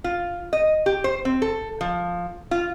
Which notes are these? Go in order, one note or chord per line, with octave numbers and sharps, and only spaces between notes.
F4
D#5
G4
C5
C4
A4
F3
F4